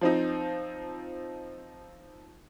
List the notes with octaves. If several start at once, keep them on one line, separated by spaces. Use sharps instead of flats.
F3 C4 D#4